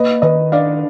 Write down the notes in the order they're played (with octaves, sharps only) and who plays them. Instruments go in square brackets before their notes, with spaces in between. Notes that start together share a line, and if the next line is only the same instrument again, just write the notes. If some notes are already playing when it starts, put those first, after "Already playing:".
Already playing: [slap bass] A#3 [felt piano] B4 D#5
[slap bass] D#3 [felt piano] B4 D#5
[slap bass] D4 [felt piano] D5 F5